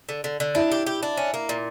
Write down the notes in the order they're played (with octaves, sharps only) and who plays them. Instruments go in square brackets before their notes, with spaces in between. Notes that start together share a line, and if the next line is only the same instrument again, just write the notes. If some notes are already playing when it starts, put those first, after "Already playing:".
[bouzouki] D3
D3
D3
[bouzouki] D4 [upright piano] E4
[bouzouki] G4
G4
D4
C#4
A#3
A#2